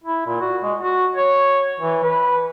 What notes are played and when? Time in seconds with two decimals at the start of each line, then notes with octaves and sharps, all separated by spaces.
0.04 E4
0.26 A#2
0.41 F#4
0.63 G#3
0.80 F#4
1.16 C#5
1.80 E3
2.03 B4